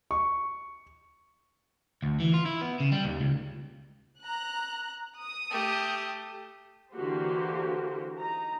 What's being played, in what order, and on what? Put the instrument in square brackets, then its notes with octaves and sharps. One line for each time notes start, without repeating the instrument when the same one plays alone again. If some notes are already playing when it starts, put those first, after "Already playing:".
[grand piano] C#6
[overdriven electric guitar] D2
E3
F4
E4
B3
C#3
G3
D#2
C#2
[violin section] A#5 F#6
D#6
[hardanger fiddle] A3 G4
[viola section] D3 E3 A#3 F#4 G4 C5
D#4 A#5